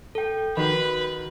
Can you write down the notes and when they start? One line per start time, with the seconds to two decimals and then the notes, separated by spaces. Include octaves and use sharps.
0.15 A4 G5
0.57 D#3 F#4 B4 B5